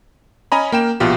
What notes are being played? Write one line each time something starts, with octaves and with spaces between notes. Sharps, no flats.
C#4 D#5 G#5 A#5 B5
A#3 G5 E7
A#1 B2 F4 G4